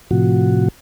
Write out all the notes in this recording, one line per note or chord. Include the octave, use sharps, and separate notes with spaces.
A2 C3 F3 F#4